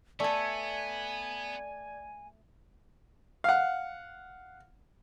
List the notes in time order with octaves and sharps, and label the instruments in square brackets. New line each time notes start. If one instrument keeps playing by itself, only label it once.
[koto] A3 A4 [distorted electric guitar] B3 [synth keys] D5 G#6 [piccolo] G#5
[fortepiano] F5 F#5